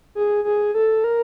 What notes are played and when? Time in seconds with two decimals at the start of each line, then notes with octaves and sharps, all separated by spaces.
0.15 G#4
0.44 G#4
0.74 A4
1.04 A#4